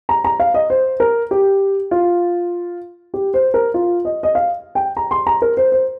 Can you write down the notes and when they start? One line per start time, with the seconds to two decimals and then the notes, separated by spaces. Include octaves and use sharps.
0.09 A#5
0.24 A#5
0.40 F5
0.54 D#5
0.70 C5
1.00 A#4
1.31 G4
1.91 F4
3.14 G4
3.34 C5
3.54 A#4
3.74 F4
4.05 D#5
4.23 D#5
4.35 F5
4.75 G5
4.97 A#5
5.11 C6
5.27 A#5
5.42 A#4
5.57 C5
5.72 C5